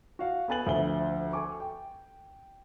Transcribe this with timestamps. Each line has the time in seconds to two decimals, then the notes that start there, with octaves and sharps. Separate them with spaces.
0.19 F#4 F5 F#5
0.48 B3 A4 B4 G#5 A6 F#7
0.67 D2 F3 E5 G7
1.33 A4 G#5 C#6 D6
1.60 G5